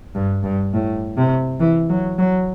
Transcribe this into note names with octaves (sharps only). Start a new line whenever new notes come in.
G2
G2
A2
C3
E3
F#3
F#3